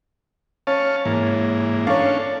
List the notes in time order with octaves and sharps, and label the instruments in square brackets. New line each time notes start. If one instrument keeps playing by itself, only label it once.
[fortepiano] C#4 [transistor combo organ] F5 A5 C#6
[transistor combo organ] G#2 E3 A#3
[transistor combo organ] C#4 D4 A4 [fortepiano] C#5 F5